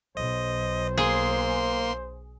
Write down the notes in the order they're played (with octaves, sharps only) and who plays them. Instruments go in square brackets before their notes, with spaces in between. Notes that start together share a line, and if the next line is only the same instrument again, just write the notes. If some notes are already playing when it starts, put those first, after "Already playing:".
[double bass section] B1 [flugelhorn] C5 [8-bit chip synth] D#5
[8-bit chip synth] A#3 C6 [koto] G#4